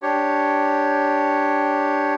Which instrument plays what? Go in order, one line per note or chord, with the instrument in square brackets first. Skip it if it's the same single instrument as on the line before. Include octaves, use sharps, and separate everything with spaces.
[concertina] D4 G4 C#5